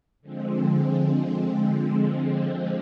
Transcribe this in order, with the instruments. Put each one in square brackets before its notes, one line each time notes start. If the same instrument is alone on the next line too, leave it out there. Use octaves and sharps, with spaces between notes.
[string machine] D3 F3 G#3 C4